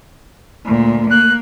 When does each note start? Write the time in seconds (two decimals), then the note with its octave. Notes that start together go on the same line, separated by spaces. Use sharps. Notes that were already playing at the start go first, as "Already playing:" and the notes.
0.65 D2 A#2
1.11 A#3 F#6